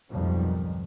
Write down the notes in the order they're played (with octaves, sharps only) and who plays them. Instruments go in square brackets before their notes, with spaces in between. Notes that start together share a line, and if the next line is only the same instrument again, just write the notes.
[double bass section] B1 F2 G#2 D#3 F3 G3